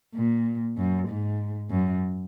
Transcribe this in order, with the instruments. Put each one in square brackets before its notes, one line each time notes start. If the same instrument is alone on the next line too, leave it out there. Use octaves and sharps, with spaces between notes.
[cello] A#2
F#2
G#2
F#2